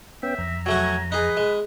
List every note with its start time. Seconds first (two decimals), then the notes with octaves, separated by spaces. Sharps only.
0.23 B3 C#4 E5 G5
0.38 F2 A#5
0.66 F#3 A3 F#4 G#5
1.12 D#4 G#4 B4
1.37 G#3